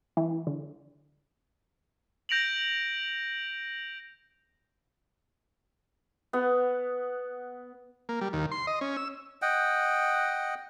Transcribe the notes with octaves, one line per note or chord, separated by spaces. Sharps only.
E3
D3
G6 A#6 D7 F7 F#7
B3 F#5
A#3
G3
D#2
C6
D#5
C#4
E6
D#5 F#5 G5